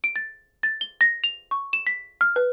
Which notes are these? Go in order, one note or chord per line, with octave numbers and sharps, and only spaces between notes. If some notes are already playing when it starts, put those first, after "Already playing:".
D7
A6
A6
G7
A#6
F7
C#6
E7
B6
F6
B4